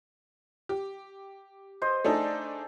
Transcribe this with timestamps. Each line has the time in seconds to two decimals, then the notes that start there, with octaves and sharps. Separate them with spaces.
0.69 G4
1.82 C5 D#5
2.05 A3 D4 D#4 G#4 A4